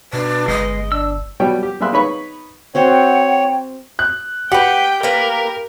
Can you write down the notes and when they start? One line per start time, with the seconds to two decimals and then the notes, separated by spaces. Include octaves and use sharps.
0.13 B2 D4 B4
0.48 G1 G#3 D#5
0.92 D4 E6
1.40 B2 G3 C#5 G5
1.63 G4
1.80 G3 A#3 G#4 E5 C6 F#6
1.92 D#4 B4 C#5 B5 C#6
2.75 C4 F#4 C5 C#5 F#5 G5
3.99 F#6
4.52 G4 B4 F#5 G5
5.03 A#3 A#4 B4